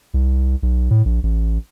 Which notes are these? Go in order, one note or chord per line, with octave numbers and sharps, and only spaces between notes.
C2
B1
A2
A#1
A1